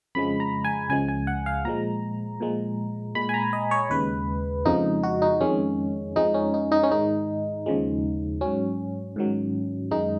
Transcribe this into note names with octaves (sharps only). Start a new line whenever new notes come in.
F2 C#3 F3 G#3 B5
A#5
G#5
C#2 C#3 F3 G#3 G#5
G#5
F#5
F5
A#2 F3 G#3 A#5
A#2 F3 G#3
A#2 G#3 B5
G#5
A#5
D#5
C#5
D#2 C#3 G#3 B4
F2 C#3 F3 G#3 D#4
F#4
D#4
F2 D#3 G#3 C#4
F2 F3 G#3 D#4
C#4
D#4
D#4
C#4
G#2 D#3 G#3 D#4
D#2 C#3 F3 G#3
G#2 F#3 C#4
G#2 D#3 F#3
F#2 D#3 G#3 D#4